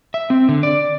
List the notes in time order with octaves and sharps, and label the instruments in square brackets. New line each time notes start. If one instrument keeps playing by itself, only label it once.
[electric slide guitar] E5
C4
D3
D5